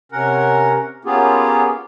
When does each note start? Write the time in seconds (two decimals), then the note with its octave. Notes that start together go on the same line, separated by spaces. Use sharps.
0.12 C3 C#4 A#4 F#5
1.05 A#3 B3 C#4 F4 G4 G#4